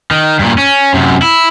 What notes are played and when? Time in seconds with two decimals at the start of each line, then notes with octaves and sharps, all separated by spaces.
0.11 D#3
0.39 G2 A#2
0.58 C#4
0.94 F#2 C3
1.22 E4